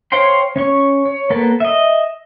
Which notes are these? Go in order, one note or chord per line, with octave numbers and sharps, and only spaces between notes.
C5 C#5 F5 G5 C6
C#4 C#5 C#6
C#5
A#3 B3 A4 B4
D#5 E5